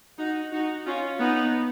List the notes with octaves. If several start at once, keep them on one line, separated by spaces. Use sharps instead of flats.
D#4 F#4
D#4 F#4
C#4 F4
B3 D#4